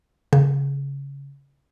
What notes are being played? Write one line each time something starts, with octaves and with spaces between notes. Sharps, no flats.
C#3